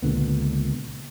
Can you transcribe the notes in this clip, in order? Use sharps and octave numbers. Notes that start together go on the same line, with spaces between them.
C#2 A#2 D3 B3